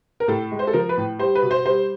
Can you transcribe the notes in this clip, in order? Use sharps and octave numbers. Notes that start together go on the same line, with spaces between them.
A#4
A2 A4
G#3
C5
A4
F3 A#4
B4
A2
G3 C5
B4
B2
C5
G3 C5